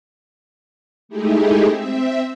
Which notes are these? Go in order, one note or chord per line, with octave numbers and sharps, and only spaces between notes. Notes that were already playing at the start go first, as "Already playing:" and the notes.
G#3 A3 D#4 E4 G4 G#4
C4 E5